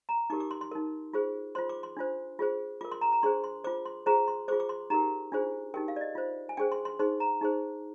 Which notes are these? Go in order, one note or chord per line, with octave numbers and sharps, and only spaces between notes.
A#5
D#4 G4 A#4 D6
D6
C6
C6
D#4 A#4
F4 G#4 C5
F4 C5 C6
D6
C6
D4 F4 C5
F4 G#4 C5
F4 A#4 D6
C6
A#5
A#5
D4 G#4 C5 C6
C6
F4 C5 D6
C6
F4 G#4 C5 A#5
C6
F4 G#4 C5 D6
D6
C6
D#4 G4 A#4 A#5
D4 F4 G#4 C5
D#4 G4 A#4 G5
F5
D5
D#5
F4 C5
G#5
D4 G#4 C5 G5
C6
C6
D#4 G#4 C5 C6
A#5
D#4 G#4 C5